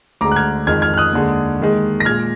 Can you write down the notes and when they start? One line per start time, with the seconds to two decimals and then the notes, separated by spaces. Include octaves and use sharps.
0.21 D2 D3 G#3 A#5 D6
0.31 F#6
0.36 F6 G#6
0.67 F2 D#3 G#3 F6 G#6
0.82 F6 G#6
0.94 F6
0.97 D#6 F#6
1.13 D#2 D3 G#3
1.60 D#2 D#3 G#3
2.00 A#6
2.05 A#2 G#3 F6 G#6